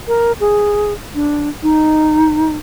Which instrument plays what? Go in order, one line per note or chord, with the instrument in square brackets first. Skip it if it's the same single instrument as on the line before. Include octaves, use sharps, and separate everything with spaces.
[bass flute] A#4
G#4
D4
D#4